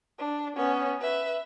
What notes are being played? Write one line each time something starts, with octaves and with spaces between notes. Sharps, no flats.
D4
B3 C#4
B4 E5